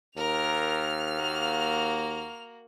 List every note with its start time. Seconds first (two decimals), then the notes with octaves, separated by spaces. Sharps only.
0.17 D#2 A#4 F6 F7
1.16 A#3 F#4